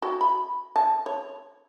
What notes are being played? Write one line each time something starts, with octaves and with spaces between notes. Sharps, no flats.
F#4 G5
B5
A5
C#5